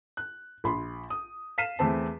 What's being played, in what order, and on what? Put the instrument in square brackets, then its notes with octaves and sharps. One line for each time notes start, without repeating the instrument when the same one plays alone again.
[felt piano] F#6
A#1 B5 C6
D#6
F5 F6 B6 C7 D#7 E7
E2 A3 C4 A5